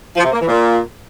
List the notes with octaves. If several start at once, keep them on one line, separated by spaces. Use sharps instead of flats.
F3
C3
A#3
E3
A#2